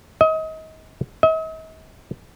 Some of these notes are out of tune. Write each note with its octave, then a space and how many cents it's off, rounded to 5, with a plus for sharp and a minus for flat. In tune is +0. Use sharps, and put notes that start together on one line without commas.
D#5 +30
D#5 +45